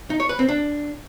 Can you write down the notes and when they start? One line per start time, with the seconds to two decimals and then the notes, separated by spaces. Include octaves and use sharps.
0.10 D#4
0.20 C#5
0.29 B4
0.39 C4
0.49 D4